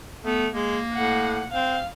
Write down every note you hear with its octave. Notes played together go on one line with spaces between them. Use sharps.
A3 B3
G#3 A#3
A2 F#5
C4 F5